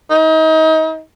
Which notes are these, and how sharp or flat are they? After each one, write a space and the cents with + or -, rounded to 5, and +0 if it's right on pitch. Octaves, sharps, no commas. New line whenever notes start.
D#4 +35